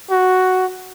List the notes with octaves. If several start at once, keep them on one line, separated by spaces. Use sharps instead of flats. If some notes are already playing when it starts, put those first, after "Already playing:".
F#4